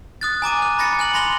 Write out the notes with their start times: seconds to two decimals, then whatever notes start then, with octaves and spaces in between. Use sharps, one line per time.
0.21 D#6 F#6 A6
0.42 G#5 A#5 D6 D#7
0.62 F#6
0.79 B5 A6 A#6 C#7
0.99 G#5 F#6 F#7
1.14 B5 C6 A#6 F7 G7